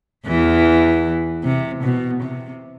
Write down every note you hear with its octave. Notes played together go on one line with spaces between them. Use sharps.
E2 E3
C3
B2
C3